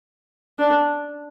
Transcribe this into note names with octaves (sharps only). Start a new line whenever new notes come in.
D4